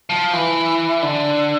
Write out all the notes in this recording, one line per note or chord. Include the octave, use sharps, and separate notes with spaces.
F3
E3
D3